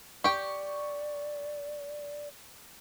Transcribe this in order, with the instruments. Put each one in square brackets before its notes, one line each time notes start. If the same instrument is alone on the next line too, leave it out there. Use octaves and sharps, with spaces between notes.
[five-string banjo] G4 G5 [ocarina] D5 [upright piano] C#6